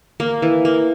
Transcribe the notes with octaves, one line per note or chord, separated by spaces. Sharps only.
A#3
E3
A#3